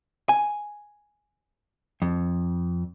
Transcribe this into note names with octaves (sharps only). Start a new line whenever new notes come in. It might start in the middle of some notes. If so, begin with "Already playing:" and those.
G#5
F2